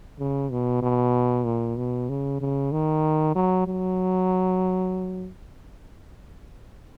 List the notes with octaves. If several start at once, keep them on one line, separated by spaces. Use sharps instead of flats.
C#3
B2
B2
A#2
B2
C#3
C#3
D#3
F#3
F#3